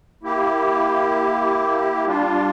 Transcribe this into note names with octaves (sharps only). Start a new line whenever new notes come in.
A#3 E4 G4
G3 D4 F4